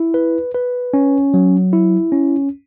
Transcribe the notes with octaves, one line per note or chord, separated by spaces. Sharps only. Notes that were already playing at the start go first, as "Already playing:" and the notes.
Already playing: E4
B4
B4
C#4
F#3
E4
C#4